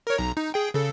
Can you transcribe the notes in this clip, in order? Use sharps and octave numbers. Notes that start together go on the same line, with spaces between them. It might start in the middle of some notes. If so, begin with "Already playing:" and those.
A#4 C#5
B1 A#5
D#4
G#4 G5
C#3 A4